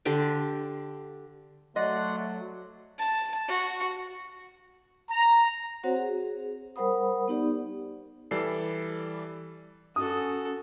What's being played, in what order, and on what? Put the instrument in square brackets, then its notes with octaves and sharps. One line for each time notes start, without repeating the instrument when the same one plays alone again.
[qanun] D3 G4 C6 D6
[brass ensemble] F#3 A3 [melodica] D5 F#5 C6 [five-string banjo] D#5
[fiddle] A5
F#4
[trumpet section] A#5
[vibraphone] C4 F#4 C5 C#5 F#5
G#4
G3 A#4 C5 F#5 B5 D#6
B3 D#4 G4 D5
[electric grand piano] E3 G3 A4 D5 C7
[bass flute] C#4 [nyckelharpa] F#4 A4 [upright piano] D#6